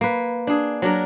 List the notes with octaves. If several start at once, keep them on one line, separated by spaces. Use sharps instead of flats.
A#3 B4
D4 G#4
F#3 D4 A#4